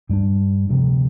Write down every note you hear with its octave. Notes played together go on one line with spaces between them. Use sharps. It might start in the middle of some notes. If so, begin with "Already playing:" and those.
G2 G3 D4
D2 C3 F3 C4